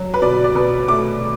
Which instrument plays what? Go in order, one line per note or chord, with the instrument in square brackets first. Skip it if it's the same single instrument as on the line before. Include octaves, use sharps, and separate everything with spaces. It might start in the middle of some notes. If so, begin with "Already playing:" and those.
Already playing: [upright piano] F#3
B4
B2 D5
D5
B2 B4
A3 D6